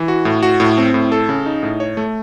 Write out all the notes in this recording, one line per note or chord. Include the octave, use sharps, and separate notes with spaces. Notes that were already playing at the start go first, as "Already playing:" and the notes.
Already playing: E3
F#4
A2
F#4
A2
C4
A2
A4
C#3
D#4
A2
C#5
A3